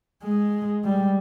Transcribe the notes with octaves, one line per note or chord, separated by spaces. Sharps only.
G#3
G3